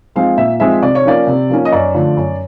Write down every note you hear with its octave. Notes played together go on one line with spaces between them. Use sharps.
F3 G#3 C4 F5
A#2 E5
F3 G#3 C4 E5
C3 D5
C#5
F3 A#3 C#4 D5
C3
F3 A#3 C#4
D#5
F#2 D5
D3 F3 A3
F#2